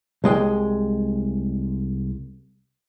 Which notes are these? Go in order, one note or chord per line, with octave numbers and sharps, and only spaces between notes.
C2 G#3 D#5 G5